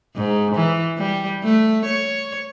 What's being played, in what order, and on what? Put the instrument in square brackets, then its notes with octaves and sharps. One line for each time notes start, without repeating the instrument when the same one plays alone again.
[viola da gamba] G#2
E3
G3
A3
C#5